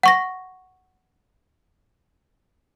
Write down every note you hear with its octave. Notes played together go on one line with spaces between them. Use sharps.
F#5 C#6 A#6